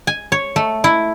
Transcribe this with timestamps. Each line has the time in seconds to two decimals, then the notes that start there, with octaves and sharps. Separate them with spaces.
0.07 G#5
0.32 C#5
0.56 A3
0.84 E4